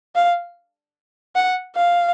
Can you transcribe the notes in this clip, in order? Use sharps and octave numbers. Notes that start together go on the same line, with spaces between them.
F5
F#5
F5